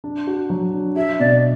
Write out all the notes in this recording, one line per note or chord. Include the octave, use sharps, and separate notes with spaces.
D4
F#4
F#3
D4
F#4 E5
B2 D5